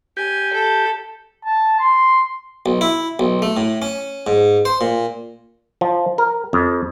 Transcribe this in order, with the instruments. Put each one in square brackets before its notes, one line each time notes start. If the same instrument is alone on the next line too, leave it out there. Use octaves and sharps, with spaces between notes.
[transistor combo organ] G4 [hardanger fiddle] G#5
[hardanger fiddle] A4
[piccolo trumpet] A5
C6
[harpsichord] B1
E4
B1
A3
A2
C#4
G#2
C5
A#2
[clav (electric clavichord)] F3
A#4
F2